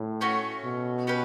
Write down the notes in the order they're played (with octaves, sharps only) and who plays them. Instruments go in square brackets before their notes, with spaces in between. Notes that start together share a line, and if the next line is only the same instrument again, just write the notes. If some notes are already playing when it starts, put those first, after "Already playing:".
Already playing: [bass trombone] A2
[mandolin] A3 C#4 F#4
[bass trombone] B2
[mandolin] C#4 G4 B4